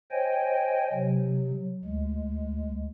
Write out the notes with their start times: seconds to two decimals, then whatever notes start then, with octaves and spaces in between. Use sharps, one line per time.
0.11 C5 C#5 D#5 G5 G#5
0.93 C3 F#3
1.85 D2 G#3